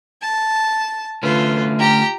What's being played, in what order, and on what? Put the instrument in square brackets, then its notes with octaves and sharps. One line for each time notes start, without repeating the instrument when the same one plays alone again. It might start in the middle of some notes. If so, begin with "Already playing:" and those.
[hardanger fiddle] A5
[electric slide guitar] D3 A3 C#4 [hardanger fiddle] F4 B4
[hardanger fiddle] G4 A#5